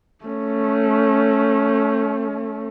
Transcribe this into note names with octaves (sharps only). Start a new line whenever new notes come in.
A3 C#4